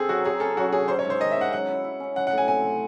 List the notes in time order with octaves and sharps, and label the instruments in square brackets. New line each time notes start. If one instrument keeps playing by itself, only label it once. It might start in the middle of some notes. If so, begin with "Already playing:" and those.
Already playing: [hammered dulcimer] C4 [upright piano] G#4 A4
[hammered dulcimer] F#3 [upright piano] F#4
[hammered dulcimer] F#3 [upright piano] G#4
[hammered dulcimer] C#4 [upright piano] A4
[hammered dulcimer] F#3 [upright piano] F#4
[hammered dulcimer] C#4 [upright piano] G#4
[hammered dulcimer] F#3 [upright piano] C5
[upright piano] C#5
[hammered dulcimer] G#2
[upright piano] C5
[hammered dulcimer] D#3 [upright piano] D#5
[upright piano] E5
[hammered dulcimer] C#4 [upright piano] F#5
[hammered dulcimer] F#3 [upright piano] F#5
[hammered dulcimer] E4
E4
C#4
[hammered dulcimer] F#3 [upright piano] F#5
[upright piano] F#5
[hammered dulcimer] A2
[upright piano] G#5
[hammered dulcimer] C4 [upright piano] G#5
[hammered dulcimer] F#3